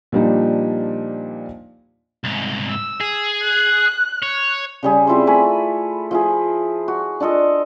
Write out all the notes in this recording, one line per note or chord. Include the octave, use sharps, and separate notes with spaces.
A#2 F3 G3 D4 D#4
C2 G#2
E6
G#4
F#6
C#5
C#3 G3 G#4
C4 E4 F4 C5
A3 A4 G#5 B5
F3 E4 G#4
F#4
D4 F4 A4 D#5